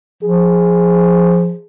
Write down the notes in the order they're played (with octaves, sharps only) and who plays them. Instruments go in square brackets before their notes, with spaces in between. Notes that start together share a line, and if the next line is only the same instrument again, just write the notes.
[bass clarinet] F3 [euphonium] G#4